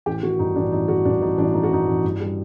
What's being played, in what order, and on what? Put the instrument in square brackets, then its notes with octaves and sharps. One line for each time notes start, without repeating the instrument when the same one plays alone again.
[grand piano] A1 G4
D#3 F#4
G2 D#4
A1 D4
A1 D#4
D#3 F#4
G2 D4
A1 D#4
A1 D4
D#3 D#4
F#4
G2 D#4
A1
G2
G3